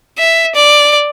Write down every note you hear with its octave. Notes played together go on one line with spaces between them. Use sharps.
E5
D5